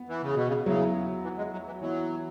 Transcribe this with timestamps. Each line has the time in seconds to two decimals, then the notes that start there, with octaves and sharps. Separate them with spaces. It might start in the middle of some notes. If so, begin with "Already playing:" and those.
Already playing: B3
0.09 E3
0.22 C#3
0.35 B2
0.47 C#3
0.66 C#3 F#3 B3 E4
1.23 E3
1.37 G#3
1.52 F#3
1.66 E3
1.81 E3 F#3 B3 E4